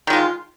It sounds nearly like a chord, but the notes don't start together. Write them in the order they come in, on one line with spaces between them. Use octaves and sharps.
D#3 G#3 F4